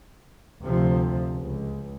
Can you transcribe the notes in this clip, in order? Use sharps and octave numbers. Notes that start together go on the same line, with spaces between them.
D2 C3 F3
C#2